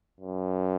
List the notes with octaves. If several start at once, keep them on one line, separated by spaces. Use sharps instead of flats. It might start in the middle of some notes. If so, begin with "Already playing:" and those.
F#2